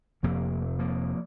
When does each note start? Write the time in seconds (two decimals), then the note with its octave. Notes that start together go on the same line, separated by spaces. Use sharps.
0.23 F1 F2 C3 F3 A#3
0.79 F3 A#3